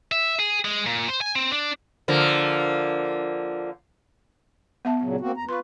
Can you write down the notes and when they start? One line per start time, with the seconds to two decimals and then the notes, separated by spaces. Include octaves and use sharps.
0.12 E5
0.39 G#4
0.65 G#3
0.86 A#2
1.09 C5
1.21 G#5
1.35 C4
1.51 D4
2.08 D3 F3 A#3
4.85 B3 E5 A5
5.01 A#2 C#3 F#3
5.20 A#3 C4 F#4
5.37 E2 A#5
5.49 F4 B4 C6 C#6